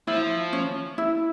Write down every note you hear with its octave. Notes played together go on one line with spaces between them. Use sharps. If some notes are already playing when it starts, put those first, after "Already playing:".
F3 E4
C#4
E4